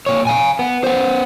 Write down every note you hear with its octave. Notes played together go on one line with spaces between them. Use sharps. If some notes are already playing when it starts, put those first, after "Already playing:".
A#2 C#5
F5 G#5
B3
B3 C5